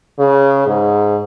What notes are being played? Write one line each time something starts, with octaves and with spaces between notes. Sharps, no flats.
C#3
G#2